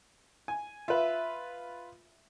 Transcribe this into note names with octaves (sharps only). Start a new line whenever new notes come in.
G#5
F4 B4 E5